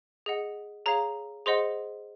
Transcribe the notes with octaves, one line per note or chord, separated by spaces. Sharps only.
G#4 D#5 F#5
G#4 C#5 F5 A#5
G#4 C5 D#5 F#5 C6